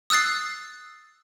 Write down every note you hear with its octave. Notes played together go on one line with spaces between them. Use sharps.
D#6 E6 F#6 A6 C7